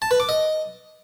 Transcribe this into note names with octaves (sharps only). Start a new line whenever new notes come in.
A5
B4
D6
D#5